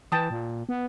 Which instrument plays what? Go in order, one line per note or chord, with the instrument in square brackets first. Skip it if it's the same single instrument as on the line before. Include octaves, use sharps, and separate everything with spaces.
[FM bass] E3 [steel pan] G5 A5 D#6
[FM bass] A#2
B3